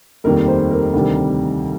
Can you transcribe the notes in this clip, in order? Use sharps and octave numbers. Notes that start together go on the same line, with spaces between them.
F1 D#2 D#3 G3 A#4
C5
A#4
D2 C3 D#3 G3